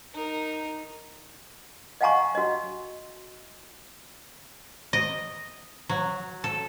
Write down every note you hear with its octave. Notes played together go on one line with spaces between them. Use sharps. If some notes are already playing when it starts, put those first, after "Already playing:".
D#4 A#4
D#5 F5 F#5 G#5 A#5 C#6
F#4 D#5
D#5
F#3
A4